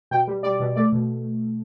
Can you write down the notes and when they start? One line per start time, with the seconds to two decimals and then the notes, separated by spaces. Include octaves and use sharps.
0.11 B2 G5
0.27 G3
0.43 G3 D5
0.60 B2
0.76 A3 D5
0.93 B2